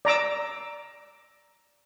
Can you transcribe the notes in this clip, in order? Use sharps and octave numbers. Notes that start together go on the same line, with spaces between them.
D5 A#5 D6 E6